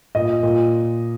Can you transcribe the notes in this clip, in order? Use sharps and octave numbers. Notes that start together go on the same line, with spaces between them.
A#2 D#5
A#2